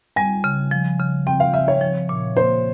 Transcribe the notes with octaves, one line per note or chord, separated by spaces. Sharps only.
G3 G#5
C#3
F3
C#3
C4 G5
F5
C#3 E5
C#5
F3
A#2
A#3 C5